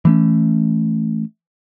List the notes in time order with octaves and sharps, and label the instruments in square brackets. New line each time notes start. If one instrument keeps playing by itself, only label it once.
[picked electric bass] E3 A3 C#4